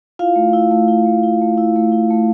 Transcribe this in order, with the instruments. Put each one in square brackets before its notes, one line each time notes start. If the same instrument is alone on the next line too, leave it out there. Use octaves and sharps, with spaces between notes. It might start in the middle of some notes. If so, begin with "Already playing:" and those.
[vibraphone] E4 F4 F5
A3
E4
A3
E4
A3
E4
A3
E4
A3
E4
A3